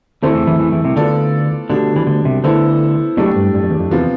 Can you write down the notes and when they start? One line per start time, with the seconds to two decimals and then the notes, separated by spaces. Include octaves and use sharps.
0.22 D2 D3 A3 C4 E4 A4 C5
0.35 E2 E3
0.47 E2 E3
0.59 E2 E3
0.72 E2 E3
0.84 C2 C3
0.96 D2 D3 B3 F4 A4 D5
1.69 D2 B2 D3 G3 D4
1.96 E3
2.07 D2 D3
2.25 C2 C3
2.44 D2 D3 B3 E4 A4 C5
3.17 B1 B2 A3 D4 G4 D5
3.36 G2
3.55 G2
3.63 F2
3.71 E2
3.79 F2
3.90 E2 C3 F3 B3 F4